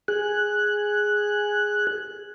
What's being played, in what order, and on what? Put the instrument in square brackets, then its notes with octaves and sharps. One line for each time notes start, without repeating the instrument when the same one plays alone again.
[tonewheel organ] G#4 F#6